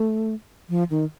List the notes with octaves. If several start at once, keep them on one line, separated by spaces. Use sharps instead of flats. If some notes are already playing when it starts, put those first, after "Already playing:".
Already playing: A3
F3
D#3